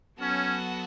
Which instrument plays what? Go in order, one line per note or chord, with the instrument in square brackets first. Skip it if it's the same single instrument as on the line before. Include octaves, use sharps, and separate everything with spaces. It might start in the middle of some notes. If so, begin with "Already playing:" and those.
[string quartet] F#3 B3 F#4 A4 [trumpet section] C#4